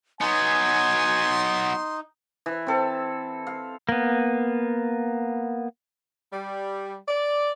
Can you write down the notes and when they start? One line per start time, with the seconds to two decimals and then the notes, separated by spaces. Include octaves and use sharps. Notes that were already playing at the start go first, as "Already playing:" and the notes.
0.21 F#3 B3 D#4 G#5 C6
2.46 E3
2.67 C4 A4
3.47 F5
3.89 A#3 B3
6.33 G3
7.08 D5